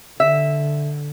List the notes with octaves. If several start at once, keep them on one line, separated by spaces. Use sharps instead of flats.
D3 E5